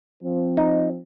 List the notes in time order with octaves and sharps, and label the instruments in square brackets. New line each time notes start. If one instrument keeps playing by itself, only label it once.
[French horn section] F3 C4
[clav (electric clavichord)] D#4